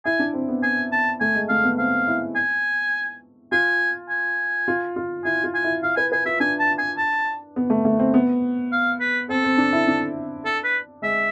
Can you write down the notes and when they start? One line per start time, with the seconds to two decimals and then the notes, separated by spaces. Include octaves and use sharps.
0.05 E4 G#5
0.19 D4
0.34 C4
0.48 B3
0.63 G#5
0.92 A5
1.20 A3 G#5
1.35 G#3
1.49 A3 F5
1.64 B3
1.78 C4 F5
2.07 E4
2.36 G#5
3.52 F4 G#5
4.09 G#5
4.68 F4
4.96 F4
5.25 E4 G#5
5.44 F4
5.54 G#5
5.64 E4
5.83 E4 F5
5.97 B4 G#5
6.12 B4 G#5
6.26 F4 E5
6.40 D4 G#5
6.59 A5
6.78 G#5
6.98 A5
7.56 B3
7.70 A3
7.85 A3
7.99 C4
8.14 B3
8.72 F5
9.00 B4
9.29 C4 A4
9.44 C4
9.58 D4
9.73 E4
9.88 D4
10.45 A4
10.64 B4
11.02 G#3 E5